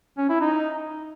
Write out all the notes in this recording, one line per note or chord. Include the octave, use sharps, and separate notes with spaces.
C#4
E4
D#4